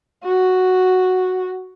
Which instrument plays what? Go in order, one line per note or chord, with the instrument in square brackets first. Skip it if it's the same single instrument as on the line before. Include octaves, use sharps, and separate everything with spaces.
[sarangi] F#4